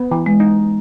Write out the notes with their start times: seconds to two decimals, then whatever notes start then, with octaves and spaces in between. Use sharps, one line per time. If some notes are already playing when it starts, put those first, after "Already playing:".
Already playing: B3
0.11 E3
0.26 G#3
0.40 D#4